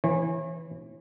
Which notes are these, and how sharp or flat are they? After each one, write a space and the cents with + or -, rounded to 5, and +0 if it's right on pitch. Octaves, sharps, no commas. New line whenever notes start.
E3 +0 C#5 -35